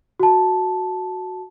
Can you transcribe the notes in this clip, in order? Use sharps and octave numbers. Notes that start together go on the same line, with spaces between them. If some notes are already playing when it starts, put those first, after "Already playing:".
F#4 A5